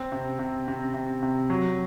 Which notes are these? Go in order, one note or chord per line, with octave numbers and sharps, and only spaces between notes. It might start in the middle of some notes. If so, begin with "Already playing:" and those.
Already playing: C4
C3
C3
C3
C3
C3
F#3